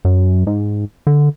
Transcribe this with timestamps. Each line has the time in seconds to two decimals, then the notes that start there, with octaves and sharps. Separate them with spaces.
0.05 F#2
0.47 G#2
1.07 D3